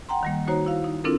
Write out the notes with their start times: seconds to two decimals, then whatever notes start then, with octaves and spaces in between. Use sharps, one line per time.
0.09 F#5 G5 A#5 C6
0.23 D#3 G3 A#3
0.48 A#3 D#4 F#4 C5 C#5 A#5
0.66 E4 F5
0.84 D#4
1.04 C4 D4 E4 F4 A4 A#4